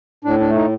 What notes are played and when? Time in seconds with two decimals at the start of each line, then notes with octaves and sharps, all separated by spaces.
0.24 A2 D4
0.40 D4
0.48 A3
0.55 D#4